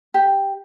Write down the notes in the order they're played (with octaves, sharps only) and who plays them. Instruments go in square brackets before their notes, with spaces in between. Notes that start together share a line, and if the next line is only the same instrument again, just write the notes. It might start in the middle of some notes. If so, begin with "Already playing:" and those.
[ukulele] G4